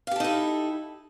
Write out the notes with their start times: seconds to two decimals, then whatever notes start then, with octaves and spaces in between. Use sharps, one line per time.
0.07 F5
0.11 G4
0.16 A4
0.20 D#4
0.24 E4